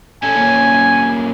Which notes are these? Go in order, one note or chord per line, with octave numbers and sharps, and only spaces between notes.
C#4 A4 G#5
A#2 C#4